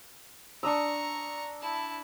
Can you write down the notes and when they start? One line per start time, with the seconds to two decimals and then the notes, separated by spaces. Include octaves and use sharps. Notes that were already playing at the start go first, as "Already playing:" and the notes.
0.63 D4 A#5 C#6 D#6 E6
1.61 E4 A5